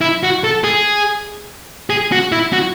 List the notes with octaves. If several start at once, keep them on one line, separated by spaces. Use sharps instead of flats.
E4
F#4
A4
G#4
G#4
F#4
E4
F#4